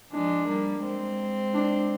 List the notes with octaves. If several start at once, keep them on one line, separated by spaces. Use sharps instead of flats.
F3 G#3 D4
G3 A#3
G#3 C4
D4